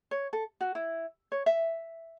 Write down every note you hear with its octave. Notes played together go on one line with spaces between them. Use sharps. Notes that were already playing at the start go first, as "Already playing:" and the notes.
C#5
A4
F#4
E4
C#5
E5